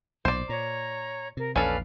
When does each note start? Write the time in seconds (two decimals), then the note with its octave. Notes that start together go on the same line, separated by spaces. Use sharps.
0.25 B1 A#2 C5 D5
0.49 A#2 C#5 A#5
1.37 C3 A#4
1.56 A#1 E2 C#4 A4 B4 D5 F5